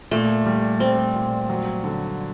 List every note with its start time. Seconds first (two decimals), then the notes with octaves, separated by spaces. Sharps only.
0.11 A#2 A3
0.46 G3
0.80 G3 C4
1.15 A#2
1.49 F#3
1.84 D3